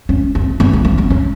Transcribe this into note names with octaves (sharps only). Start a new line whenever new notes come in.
C#4
C4
B3
A#3
B3
C4
C#4